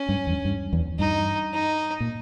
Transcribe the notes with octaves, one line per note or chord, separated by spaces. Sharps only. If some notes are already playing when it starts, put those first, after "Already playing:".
Already playing: C#4
G2
E2
G2
E2
G2 D#4
D#4
A#2